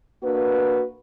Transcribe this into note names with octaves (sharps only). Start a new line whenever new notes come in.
A#3 D4 F#4 B4